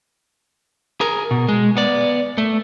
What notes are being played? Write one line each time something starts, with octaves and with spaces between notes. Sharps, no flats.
G#4 A#4
B2
G#3
B3 D5
A3